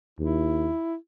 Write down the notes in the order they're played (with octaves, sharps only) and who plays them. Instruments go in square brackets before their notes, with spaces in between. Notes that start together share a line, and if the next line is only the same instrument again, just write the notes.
[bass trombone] D#2 [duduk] E4